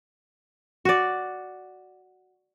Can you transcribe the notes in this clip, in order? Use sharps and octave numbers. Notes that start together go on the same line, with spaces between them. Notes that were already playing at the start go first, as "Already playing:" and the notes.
F#4 D5